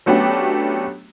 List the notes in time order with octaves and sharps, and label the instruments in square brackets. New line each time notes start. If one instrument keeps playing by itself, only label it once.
[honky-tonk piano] F#3 A3 B3 C#4 D4 G4